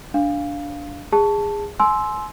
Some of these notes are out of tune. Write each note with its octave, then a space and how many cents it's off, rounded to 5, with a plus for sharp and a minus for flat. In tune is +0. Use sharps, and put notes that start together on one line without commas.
D4 -10 F5 +0
G#4 -20 A5 +0
G#5 +35 C6 +0 E6 +0